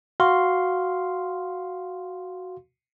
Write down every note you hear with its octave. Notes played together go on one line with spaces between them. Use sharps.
F#4 F5 C6